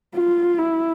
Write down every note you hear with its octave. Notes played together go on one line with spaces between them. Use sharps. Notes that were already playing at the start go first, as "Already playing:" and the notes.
F4
E4